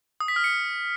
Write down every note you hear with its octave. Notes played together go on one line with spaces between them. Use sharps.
D#6
B6
F6
C#7